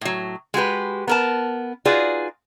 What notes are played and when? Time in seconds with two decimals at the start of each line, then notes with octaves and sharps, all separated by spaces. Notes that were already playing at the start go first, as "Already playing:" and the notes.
0.01 A2 F#3
0.54 G#3 F#4 G4 B4
1.08 B3 A#4 A5
1.85 D#4 F4 F#4 G#4 B4 D5